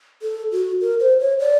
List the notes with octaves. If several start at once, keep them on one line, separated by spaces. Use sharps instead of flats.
A4
F#4
A#4
C5
C#5
D5